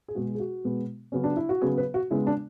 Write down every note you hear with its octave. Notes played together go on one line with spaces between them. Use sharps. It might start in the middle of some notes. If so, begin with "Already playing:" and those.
G#4
B2 G#3 B3 F#4
G#4
F#4
B2 G#3 B3
C#3 F#3 B3 C#4
D4
E4
F#4
C#3 F#3 B3 G#4
B4
F#4
C#3 G#3 B3 E4
D4